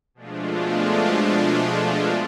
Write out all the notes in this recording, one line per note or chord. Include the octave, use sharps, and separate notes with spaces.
B2 F3 G#3 A3 D4 F4